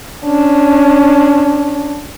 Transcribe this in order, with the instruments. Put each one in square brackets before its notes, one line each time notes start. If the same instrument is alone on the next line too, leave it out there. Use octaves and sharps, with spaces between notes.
[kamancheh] C#4 D4